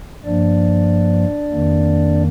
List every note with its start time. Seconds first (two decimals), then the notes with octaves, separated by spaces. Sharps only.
0.25 G2 F3 A#3 D4 D5
1.51 F2 D#3 A#3